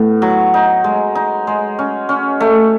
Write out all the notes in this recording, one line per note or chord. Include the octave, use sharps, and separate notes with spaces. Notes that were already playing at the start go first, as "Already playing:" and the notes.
Already playing: A2 B3
F#3
D#4
G#3
D#4
G#3
C#4
C#4
A3